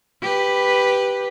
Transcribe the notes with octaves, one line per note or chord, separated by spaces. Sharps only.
G4 B4